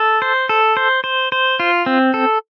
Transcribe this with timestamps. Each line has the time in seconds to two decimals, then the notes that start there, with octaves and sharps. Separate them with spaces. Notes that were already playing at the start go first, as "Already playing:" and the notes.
Already playing: A4
0.22 C5
0.49 A4
0.77 C5
1.04 C5
1.32 C5
1.60 F4
1.86 C4
2.14 A4